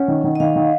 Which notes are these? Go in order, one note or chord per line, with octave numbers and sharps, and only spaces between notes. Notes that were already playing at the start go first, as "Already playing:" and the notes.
Already playing: C#4 F#5
D#3
D#3
D#5
D#3 F5
D#3